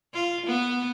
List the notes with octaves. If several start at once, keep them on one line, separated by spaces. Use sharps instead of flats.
F4
B3